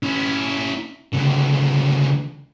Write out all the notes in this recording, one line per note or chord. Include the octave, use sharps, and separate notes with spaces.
C#4 E4
C#2 D3